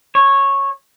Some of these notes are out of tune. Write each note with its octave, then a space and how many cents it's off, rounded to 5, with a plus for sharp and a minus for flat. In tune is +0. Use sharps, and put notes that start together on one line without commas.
C#5 -10